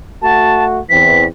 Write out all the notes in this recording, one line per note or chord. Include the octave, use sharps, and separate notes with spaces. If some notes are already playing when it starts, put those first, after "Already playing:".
A3 F#4 A5
E2 E3 C4 B6